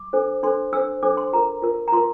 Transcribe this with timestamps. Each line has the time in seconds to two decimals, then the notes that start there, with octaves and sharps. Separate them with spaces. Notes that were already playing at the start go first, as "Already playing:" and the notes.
Already playing: D6
0.13 D4 A4 C5
0.43 D4 A4 C5 C6
0.73 D4 A4 C5 E6
1.03 D4 A4 C5 D6
1.17 C6
1.33 F4 A#4 A#5
1.62 F4 A#4
1.88 A#5
1.92 F4 A#4 C6